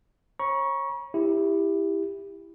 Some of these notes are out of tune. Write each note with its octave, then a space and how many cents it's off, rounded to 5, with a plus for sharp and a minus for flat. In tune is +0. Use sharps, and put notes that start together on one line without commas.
C#5 -35 A#5 +45 C#6 +0
E4 +0 G4 +20